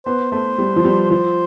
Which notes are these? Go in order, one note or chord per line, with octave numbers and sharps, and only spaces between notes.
B3 C5
A3 C5
G3
F3
G3
F3 C5